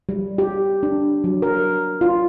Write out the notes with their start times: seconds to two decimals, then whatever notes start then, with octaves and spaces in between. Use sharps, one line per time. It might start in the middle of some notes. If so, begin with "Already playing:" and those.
0.09 G3
0.38 G4
0.83 D4
1.24 F#3
1.42 A#4
2.01 F4